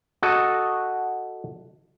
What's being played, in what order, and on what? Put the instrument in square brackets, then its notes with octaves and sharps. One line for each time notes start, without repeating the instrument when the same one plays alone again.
[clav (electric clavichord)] F#4 A4 D#5